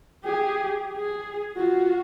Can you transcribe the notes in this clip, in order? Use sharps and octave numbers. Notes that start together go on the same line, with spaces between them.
G4 G#4
G#4
F4 F#4